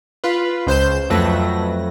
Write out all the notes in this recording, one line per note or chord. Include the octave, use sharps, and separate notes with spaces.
F4 B4
C#2 C5 G6 E7
F2 F#3 A3 B4 A#6